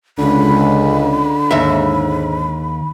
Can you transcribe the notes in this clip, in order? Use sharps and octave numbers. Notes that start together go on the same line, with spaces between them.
C#2 D3 B5
D#2 G#2 E5